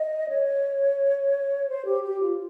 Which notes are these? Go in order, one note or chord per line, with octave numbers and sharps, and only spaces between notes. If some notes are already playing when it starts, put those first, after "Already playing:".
Already playing: D#5
C#5
C5
G4
G4
F4